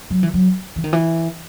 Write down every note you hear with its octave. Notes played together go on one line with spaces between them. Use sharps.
F#3
E3
F#3
E3
D#3
E3